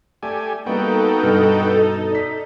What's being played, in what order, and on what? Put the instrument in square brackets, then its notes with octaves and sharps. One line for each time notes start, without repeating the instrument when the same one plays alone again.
[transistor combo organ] A3 G4 G#5 [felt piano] D5
[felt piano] G3 A#3 [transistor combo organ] B3 F#4 G5 [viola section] D#4 A4
[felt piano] G2 B2 F6
D5 B6